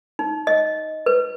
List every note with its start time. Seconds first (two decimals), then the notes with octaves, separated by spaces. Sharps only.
0.19 D#4
0.47 D#5
1.06 B4